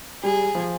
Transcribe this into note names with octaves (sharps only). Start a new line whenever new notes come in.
G3 G#4
F3